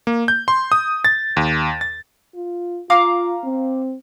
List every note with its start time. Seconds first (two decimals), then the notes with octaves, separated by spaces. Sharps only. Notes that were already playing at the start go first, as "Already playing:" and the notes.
0.07 A#3
0.28 G6
0.48 C6
0.72 D#6
1.05 A6
1.37 D#2
1.81 A6
2.35 F4
2.90 F4 F5 A#5 D6
3.44 C4